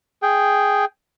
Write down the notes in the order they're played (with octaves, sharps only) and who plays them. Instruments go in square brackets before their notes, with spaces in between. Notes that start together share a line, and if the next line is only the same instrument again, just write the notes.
[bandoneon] G#4 G5